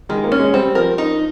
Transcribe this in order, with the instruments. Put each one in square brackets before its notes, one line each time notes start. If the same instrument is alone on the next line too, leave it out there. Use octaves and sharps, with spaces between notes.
[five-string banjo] D#3 [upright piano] G#3
[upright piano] A#3
[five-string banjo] C#4
[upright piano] G#3
[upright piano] G3 [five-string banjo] C4
[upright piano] F3 [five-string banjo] A#4
[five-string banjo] D#4